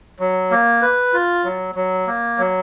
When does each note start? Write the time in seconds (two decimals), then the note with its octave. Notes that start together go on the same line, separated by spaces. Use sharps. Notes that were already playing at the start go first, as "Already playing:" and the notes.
0.20 F#3
0.51 A#3
0.82 B4
1.13 F4
1.44 F#3
1.75 F#3
2.07 A#3
2.38 F#3